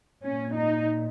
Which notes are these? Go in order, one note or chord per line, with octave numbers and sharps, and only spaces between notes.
A#2 C#4
D#4